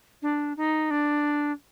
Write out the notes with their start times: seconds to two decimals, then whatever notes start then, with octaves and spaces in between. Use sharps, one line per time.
0.22 D4
0.56 D#4
0.90 D4